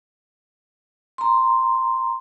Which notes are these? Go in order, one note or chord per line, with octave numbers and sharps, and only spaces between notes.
A#5 C6